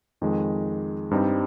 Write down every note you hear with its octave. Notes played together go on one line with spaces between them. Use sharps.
F2 D#3 G#3
G2 G3 C4 D#4